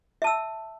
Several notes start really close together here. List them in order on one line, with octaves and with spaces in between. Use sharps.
E5 A5 E6